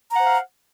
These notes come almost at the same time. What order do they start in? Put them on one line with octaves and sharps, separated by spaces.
A#5 F#5 C5 F5